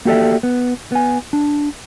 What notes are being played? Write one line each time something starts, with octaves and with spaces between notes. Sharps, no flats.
A#3 F#4 G4 A4 D5 E5
B3
B3 G#5
D4